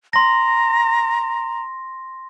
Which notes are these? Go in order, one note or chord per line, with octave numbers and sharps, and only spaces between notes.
A#5 C6 A#6